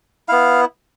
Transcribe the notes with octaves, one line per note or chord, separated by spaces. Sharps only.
B3 E4 F5